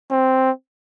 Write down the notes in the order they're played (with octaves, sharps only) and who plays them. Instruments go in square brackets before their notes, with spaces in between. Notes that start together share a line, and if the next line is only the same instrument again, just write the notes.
[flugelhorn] C4